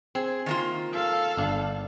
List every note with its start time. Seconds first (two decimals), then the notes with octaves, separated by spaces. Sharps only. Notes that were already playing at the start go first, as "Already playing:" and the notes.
0.15 C4 G#4
0.46 D#3 A#3 F4
0.93 A4 F5
1.37 G1 D4